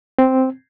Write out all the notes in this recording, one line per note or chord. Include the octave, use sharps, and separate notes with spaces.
C4